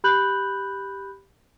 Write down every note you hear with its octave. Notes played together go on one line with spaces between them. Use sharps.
G4 B5 F#6 G6 F#7